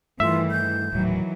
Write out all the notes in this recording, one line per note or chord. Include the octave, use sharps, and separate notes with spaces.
G2 D#3 E3 A3 F4 E5
G6
D#1 A2 D#3 E3 F#3